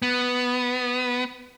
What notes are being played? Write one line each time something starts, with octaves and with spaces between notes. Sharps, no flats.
B3